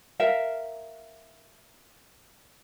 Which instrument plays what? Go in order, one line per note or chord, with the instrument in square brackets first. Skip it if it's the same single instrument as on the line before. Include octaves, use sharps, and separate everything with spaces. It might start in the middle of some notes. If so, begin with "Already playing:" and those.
[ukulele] A#4 E5 F5